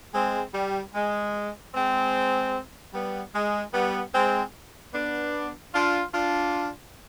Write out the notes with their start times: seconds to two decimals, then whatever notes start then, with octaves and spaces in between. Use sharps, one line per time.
0.15 G#3 C4
0.54 G3
0.95 G#3
1.74 G#3 C4
2.94 G3 B3
3.35 G#3
3.74 G3 B3
4.15 G#3 C4
4.94 B3 D4
5.74 D4 F4
6.14 D4 F4